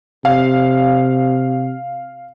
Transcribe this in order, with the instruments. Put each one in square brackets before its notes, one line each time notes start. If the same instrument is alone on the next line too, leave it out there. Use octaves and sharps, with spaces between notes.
[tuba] C3 [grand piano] F5